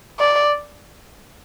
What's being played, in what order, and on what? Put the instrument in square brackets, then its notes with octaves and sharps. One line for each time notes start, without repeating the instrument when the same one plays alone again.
[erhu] D5